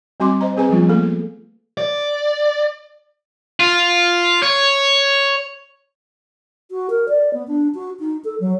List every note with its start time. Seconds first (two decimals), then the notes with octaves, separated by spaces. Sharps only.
0.20 G3 C4 F#4 G#5 C6 D6
0.41 C5 D#5 A#5
0.57 C4 G#4 B4 G#5 A#5
0.69 F3 G3 G#3 A#3 B3 F4
0.89 A3 A#3 A4
1.77 D5
3.60 F4
4.43 C#5
6.70 F#4
6.90 A#4
7.09 D5
7.34 B3
7.48 D4
7.75 F#4
8.00 D#4
8.24 A4
8.40 F#3